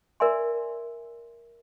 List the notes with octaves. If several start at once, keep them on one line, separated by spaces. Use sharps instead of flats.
A#4 D5 E5 G#5 C6